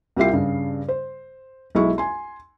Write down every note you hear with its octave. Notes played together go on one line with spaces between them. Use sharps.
C2 E4 F4 G4 E5 C7
G2 C#3
C5
B1 G#3 E4 C#6
G#5 C6